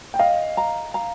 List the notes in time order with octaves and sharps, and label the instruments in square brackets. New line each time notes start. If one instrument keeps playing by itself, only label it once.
[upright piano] G5
[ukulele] D#5 [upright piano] F5
[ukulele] A#5
A#5